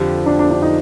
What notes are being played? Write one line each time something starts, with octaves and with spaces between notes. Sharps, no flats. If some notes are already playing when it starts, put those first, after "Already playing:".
Already playing: F2 D3 F3 G4
D4
D4
D4
D#4